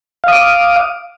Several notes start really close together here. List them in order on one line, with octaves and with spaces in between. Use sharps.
F5 D#6 D6